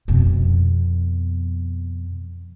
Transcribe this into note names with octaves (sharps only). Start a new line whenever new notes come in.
F2 B2